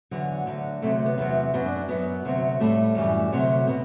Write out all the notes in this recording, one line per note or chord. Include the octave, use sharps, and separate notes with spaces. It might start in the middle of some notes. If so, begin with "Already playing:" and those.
E2 D3 F#3
D2 D3 F#3
D2 C3 F#3 A3
B3
E2 C3 F#3
F#2 F#3 B3
D4
D4
F#2 F#3 B3
D2 C3 F#3
A2 G3 A3
F#2 E3 G3
D2 C3 F#3
B2 B3